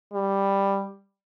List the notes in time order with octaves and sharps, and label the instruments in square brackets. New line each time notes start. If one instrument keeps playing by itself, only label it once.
[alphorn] G3